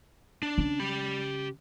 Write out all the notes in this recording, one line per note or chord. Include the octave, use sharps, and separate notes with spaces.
D4
C#3
G4 B5